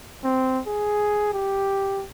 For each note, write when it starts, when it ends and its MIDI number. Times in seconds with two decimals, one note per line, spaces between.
0.24 0.61 60
0.67 1.33 68
1.33 2.04 67